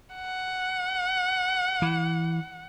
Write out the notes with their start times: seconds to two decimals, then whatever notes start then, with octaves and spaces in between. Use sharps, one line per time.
0.15 F#5
1.82 E3